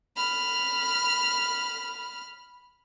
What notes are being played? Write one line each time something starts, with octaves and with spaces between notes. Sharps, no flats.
B5 F6